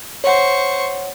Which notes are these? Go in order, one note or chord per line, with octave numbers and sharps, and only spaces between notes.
C5 C#5 F#5 C#6